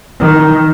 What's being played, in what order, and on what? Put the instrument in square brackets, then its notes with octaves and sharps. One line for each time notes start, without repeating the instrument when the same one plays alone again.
[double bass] D#3